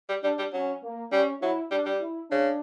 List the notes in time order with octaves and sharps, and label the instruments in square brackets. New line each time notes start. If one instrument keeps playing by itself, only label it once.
[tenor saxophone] G3
[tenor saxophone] G3 [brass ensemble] D4
[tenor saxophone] G3
[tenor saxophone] F#3 [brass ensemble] C#4
[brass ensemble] A#3
[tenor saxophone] G3 [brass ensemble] C#4
[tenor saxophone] F#3 [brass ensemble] E4
[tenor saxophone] G3 [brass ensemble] D4
[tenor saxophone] G3
[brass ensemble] E4
[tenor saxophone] C#3 [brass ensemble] D4